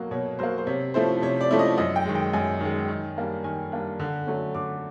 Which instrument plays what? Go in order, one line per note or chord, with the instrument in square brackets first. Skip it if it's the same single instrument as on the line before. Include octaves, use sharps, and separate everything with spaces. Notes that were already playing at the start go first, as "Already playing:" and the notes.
Already playing: [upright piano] B2 F#3 A#3
B2 C#5
F#3 A#3 C5
C5
C3 C#5
F3 A3 C#4 E4 C5
C3 C#5
D5
F3 A3 C#4 E4
D#5
F#2 D#5
G5
D#3 G#3
G5
F#2 G#5
D#3 G#3
D#3
G3 A#3 D4
D#3 G#5
G3 A#3 D4
D3
F#3 A3 C#4
D3 D6